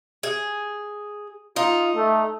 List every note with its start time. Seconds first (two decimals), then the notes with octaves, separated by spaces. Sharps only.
0.23 G#4
1.56 D#4 F4
1.95 A3